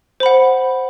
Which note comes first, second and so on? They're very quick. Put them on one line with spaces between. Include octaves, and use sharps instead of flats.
C5 B5 F#5